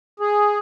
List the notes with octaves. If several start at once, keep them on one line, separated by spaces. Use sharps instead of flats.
G#4